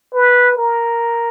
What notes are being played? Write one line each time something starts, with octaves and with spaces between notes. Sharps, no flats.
B4
A#4